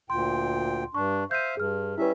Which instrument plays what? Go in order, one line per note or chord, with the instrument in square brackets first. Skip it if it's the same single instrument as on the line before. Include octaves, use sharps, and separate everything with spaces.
[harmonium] D2 A#2 G5 [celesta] C6
[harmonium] G2 D4 [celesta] C#6
[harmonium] C5 E5 F5 [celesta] G6 D#7
[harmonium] G2 [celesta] G#4 F6
[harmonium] G3 C#4 E5 [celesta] E4 G4 B4